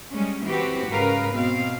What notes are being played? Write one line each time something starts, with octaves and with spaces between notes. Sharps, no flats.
G3 G#3 C#4
E3 C4 F#4 G4 B4
G#2 C#3 A#4 B4 F5
B2 C4 F5